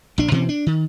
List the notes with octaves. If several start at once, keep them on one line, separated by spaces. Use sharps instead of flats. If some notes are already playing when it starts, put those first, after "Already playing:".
A#1 D4
B2 E3 C4 C#4
D4
D#3